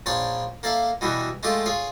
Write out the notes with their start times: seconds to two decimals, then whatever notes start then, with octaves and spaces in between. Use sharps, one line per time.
0.06 A#1 D4 C#5 D5 G5 C6
0.63 A#3 A4 D5 E5 F5
1.01 B2 E3 G3 F#4 G4
1.43 G#3 A3 F4 G4 A5 D6
1.66 F4 G#4 C#5